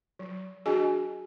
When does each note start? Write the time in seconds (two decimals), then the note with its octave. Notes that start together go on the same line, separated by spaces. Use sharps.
0.19 F#3
0.66 D4 F#4 G#4 D#5 G#5